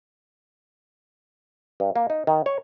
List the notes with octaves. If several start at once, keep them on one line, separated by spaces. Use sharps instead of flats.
G2
A#3
D#4
D#3
C#5